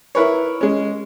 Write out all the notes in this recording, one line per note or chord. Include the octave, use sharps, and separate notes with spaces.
E4 A#4 B4 C#5
G#3 C#4